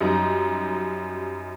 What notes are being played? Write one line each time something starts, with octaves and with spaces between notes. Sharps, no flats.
F#2 G3 D#4 A#5